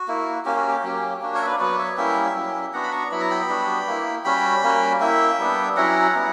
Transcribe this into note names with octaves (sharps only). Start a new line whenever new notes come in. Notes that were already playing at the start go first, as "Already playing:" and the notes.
Already playing: F#4
A#3 E4
A#3 C#4 F#4 G4
F#4
G4
F#3 A#3 C#4
A#3 D4 F#4
A#4 C#5
E5
B4 D5
F#3 B3 F#4 B4 D5
C#5 E5
G3 A#3 C#4 E4 E5 G5
F#3 C#4 E4
B3 D4 F#4 F#5 A#5
B5
A#5 C#6
F#3 B3 E4 B5
A#5
G5 B5
G3 B3 D4 F#4
A#3 E4
G3 C#4 F#4 G5 B5
G3 A#3 C#4 F#4
A#3 E4 E5 G5
G3 B3 D4
F#3 C#4 E4 F#5 A#5
G3 B3 E4